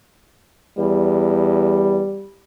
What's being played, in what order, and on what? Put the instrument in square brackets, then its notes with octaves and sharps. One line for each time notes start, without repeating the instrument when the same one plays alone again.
[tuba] E2 [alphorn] G3